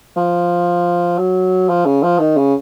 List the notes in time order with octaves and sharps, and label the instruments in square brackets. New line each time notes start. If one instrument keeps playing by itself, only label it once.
[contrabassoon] F3
F#3
F3
C#3
F3
D#3
C#3